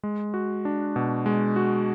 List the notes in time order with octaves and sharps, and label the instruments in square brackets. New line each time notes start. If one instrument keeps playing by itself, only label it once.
[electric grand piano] G#3
F#4
D4
B2
G#3
F#4